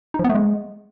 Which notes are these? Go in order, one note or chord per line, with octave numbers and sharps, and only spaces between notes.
D#4
F3
B3
A3
G#3